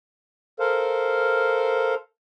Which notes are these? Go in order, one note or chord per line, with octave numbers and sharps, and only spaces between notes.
A4 A#4 C5 F5